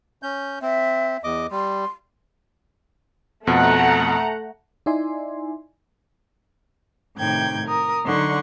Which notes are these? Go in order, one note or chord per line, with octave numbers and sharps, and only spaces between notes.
C#4 G6
C4 E5
E2 D#5 D6
G3 C6
F2 B2 A3 F#5 A#5
D#4 E4 D5 E5 G#5 C6
A2 C3 D#3 G5 G6 G#6
A#4 D#6
D3 F#3 D#4 F#5 C6 C#6